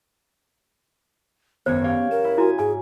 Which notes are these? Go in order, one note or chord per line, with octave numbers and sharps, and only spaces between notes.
G#1 F#2 B3 C5 C#5
G4 C#5 F5
A#4 E7
E4
E4 F#4 G#4 G#5
G#2 G#4 G#5